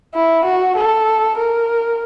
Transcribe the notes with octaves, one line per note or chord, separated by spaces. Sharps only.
E4
F#4
A4
A#4